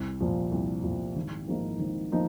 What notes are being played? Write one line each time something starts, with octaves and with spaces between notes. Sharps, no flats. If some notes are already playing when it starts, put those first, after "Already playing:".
Already playing: C2
A#2 F3
C2
A#2 F3
G#1
G#2 F3 A#3 D#4
G#1
F3 A#3 D#4